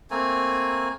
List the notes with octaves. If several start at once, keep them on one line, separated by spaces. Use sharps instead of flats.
A3 A#3 C4 G#5